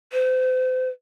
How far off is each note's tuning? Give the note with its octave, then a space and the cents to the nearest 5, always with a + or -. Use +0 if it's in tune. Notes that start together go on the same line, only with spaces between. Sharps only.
C5 -35